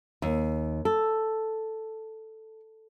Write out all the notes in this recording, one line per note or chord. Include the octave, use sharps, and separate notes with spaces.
D#2
A4